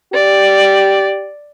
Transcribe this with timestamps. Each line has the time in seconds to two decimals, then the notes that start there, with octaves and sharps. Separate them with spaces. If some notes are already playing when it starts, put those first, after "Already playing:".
0.13 G4 D5